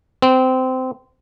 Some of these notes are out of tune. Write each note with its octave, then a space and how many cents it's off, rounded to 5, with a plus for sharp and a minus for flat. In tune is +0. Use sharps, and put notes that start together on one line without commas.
C4 -20